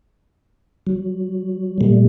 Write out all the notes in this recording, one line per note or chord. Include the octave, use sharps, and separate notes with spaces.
F#3
A#2 G3 A3